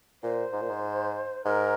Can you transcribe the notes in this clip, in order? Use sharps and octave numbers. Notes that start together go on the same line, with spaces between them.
A#2 C5
G#2
A#2
G#2
G#2 A#4